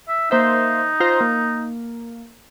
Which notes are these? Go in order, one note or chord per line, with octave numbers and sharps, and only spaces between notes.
E5
A#3 D#4 C5 E5
F4 C5 A#5
A#3